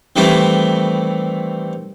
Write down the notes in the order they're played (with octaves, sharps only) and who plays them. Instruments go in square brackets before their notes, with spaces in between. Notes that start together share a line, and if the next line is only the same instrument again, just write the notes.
[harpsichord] D#3 E3 G3 A3 C4 E4